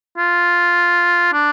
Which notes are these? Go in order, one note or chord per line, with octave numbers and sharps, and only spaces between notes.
F4
D4